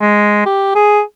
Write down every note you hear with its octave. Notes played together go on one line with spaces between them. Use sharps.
G#3
G4
G#4